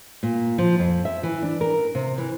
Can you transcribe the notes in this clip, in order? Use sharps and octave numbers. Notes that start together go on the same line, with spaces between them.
A#2
F3
F2
E5
E3
D4
A#4
C3
E3